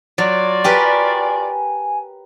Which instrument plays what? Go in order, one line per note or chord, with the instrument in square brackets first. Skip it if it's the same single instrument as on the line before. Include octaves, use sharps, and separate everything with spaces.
[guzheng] F#3 [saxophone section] F4 F#4 D5
[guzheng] G4 A#4 B4 [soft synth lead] G#5